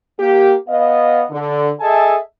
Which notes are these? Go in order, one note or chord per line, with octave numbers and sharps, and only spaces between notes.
A#3 G4
B3 D#5 F5
D3
G#4 A4 D#5 E5 G#5 A5